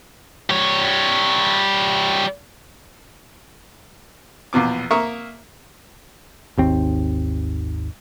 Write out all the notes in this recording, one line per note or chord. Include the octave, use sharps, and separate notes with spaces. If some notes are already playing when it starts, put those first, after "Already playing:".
G3 C#5
A#1 E2 B2 D6
A#3 A#4 E5 C#6 D#6
G#1 D#2 C4